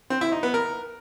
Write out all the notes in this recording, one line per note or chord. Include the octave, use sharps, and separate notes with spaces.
C4
E4
D#4
B3
A#4